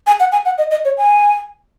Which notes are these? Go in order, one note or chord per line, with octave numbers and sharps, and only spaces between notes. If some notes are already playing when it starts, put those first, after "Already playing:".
G#5
F#5
G#5
F#5
D#5
D#5
C#5
G#5